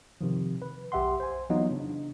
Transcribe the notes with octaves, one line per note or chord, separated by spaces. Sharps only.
C3 D#3 F3
B4
B1 G4 E5 F#5 C6
C5 G#5
E3 F#3 B3 D#4 F4 D#5
C#3 D4